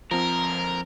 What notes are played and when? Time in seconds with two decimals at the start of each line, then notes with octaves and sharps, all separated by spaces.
0.11 F2 F3 C4 A#4 A#5